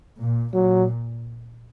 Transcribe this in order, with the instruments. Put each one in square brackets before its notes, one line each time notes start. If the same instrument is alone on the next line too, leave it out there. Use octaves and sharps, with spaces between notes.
[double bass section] A#2
[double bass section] A#2 [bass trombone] F#3